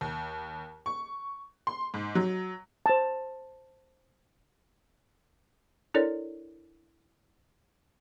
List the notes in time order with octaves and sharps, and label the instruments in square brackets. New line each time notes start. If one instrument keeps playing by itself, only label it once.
[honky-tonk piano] D#2
C#6
C6
G#2
F#3
[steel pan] C5 A5
[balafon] D4 E4 A4 A#4 C#5 D5